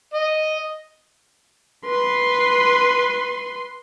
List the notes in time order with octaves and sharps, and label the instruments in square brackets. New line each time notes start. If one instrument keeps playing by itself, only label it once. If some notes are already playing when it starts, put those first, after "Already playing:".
[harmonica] D#5
[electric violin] B4 C6